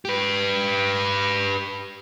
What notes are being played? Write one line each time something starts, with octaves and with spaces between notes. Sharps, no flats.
G4 B4